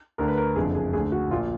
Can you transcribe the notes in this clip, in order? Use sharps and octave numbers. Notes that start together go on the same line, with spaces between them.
D2 D3 A#4
B4
A#4
F#1 F2 D3 G#4
G#4
D2 D3 G#4
F#4
A#1 A#2 F4